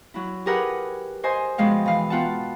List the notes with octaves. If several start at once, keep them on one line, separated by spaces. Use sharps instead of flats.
F#3 E4
G4 G#4 A#4 B4 F#5
C5 D#5 G#5 C6
B2 F3 G#3 F5 G5
E3 F5
B3 F4 F#5 G5 A5